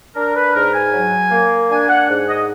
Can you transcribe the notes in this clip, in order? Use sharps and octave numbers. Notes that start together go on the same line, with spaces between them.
D4 A#4
B4
G#2 A#4
G#5
F#3
A#3
D4 G#5
F#5
G#2
D#5